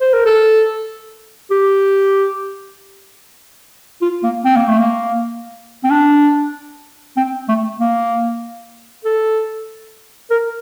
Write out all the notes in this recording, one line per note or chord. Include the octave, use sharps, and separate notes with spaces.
C5
A#4
A4
G4
F4
A#3
C4
A#3
A3
A#3
C4
D4
C4
A3
A#3
A4
A#4